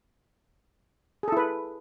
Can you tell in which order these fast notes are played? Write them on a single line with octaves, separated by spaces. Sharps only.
G#4 A4 E4 B4